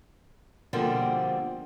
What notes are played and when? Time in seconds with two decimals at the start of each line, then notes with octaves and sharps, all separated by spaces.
0.73 B2 D3 F3 G3 A#3 C4